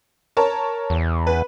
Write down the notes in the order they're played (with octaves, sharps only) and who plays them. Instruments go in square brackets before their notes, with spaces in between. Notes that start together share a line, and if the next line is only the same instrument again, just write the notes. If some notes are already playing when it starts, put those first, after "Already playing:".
[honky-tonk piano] A#4 C#5 A5
[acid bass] E2
[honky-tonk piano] B4